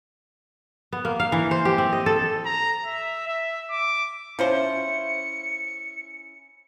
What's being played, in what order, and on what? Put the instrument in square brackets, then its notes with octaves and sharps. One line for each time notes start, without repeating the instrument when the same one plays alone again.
[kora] B3
A#3
F5
E3
C5
G4
C4
D#5
A4
[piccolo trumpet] A#5
E5
E5
D6
[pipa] F3 F4 C5 [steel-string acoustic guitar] C#4 E4 [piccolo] C#7